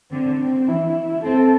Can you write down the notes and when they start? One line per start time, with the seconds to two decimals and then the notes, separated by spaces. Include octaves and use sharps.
0.11 D3 C4
0.40 C4
0.68 E3 E4
1.24 C4 A4